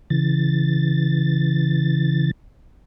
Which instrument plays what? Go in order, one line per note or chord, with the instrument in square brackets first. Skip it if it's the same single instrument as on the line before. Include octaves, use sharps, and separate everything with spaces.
[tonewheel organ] C#3 E3 A6